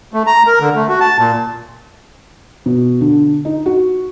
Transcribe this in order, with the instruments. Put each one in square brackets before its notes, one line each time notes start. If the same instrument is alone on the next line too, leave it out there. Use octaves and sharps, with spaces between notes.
[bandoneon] A3
A#5
A#4
D3
A3
F#4
A5
A#2
[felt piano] B2
D3
D#4
F#4